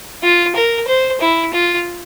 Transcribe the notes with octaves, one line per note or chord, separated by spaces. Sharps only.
F4
A#4
C5
E4
F4